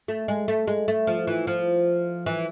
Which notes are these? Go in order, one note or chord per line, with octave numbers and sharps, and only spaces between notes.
A3
G#3
A3
G#3
A3
F3
E3
F3
E3